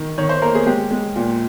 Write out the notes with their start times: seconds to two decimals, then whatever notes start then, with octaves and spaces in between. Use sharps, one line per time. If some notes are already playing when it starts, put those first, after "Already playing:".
Already playing: D#3
0.18 D#3 C#5
0.29 C5
0.42 A#3 A#4
0.55 G#4
0.66 G#3 G4
0.91 G#3
1.16 A#2